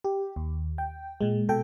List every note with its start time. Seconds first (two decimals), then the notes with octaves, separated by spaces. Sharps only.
0.04 G4
0.36 D#2
0.78 G5
1.21 A#2 G#3
1.49 B2 A4 G5